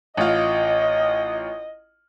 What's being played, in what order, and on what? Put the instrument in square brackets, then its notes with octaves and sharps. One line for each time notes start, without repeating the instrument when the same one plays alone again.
[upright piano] A1 F4 [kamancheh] D#5